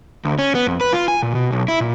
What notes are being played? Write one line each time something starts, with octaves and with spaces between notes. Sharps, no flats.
D2
C#4
B3
F2
B4
F4
G#5
A#2
B2
B1
E4
A#2